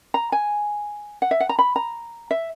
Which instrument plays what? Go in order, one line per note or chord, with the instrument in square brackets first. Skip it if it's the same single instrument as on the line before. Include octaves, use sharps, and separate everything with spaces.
[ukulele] A#5
G#5
F#5
E5
F#5
A#5
B5
A#5
E5